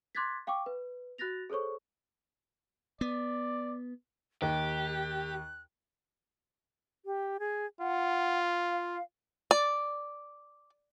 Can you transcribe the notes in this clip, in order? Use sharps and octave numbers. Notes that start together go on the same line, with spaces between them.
C6 D6 F#6 G#6 A6 B6
F5 G5 C#6 D6
B4
F#4 F#6 A6 A#6 F7
G#4 A4 C5 C#5 C#6
B3 D5
D#2 G4 F#6
G4
G#4
F4 F#5
F5
D5